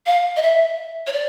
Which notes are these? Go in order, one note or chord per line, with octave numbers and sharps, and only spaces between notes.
F5
D#5
E5
C#5
D5